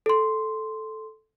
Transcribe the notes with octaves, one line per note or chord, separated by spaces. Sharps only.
A4 C6